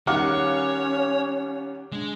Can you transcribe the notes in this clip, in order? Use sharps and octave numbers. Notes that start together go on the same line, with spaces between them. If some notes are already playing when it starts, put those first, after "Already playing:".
D#3 G3 C#4 C#5 F5 F#5 D6
G#3 D4